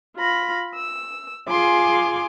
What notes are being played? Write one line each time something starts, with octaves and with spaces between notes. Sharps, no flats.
F4 B5 A#6
E6
F4 G#4 G#5 C6 D6